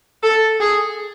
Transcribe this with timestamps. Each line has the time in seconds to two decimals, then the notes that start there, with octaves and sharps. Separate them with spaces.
0.23 A4
0.60 G#4